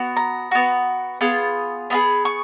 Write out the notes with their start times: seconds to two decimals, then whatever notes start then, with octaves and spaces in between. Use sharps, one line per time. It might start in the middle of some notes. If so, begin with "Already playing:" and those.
Already playing: B3 F#4
0.17 A#5
0.51 B3 F#4
1.21 B3 F4 G#4
1.90 B3 F4 G#4 B5
2.25 C#6